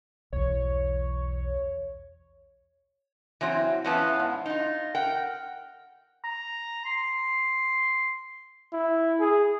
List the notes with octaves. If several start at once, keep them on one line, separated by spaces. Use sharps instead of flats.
B1 E2 C#5
E3 F#3 C4
E2 E3 B3 C#4 F4 A5
G#2
D#4 F4
A#4 F#5 G5
A#5
C6
E4
G#4